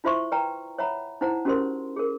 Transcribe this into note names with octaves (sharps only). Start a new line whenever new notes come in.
E4 F4 C5 E5 C6 C#6
B4 D5 G5 A#5
C#5 E5 F#5 A#5 B5
D#4 E4 C5 F#5 A#5
C#4 F#4 G4 A#4 C5 C6
G#4 A#4